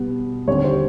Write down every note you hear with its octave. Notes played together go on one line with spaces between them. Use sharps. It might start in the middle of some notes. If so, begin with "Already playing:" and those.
Already playing: B2 G3 B3
D#2 D3 G3 C4 C#5
C5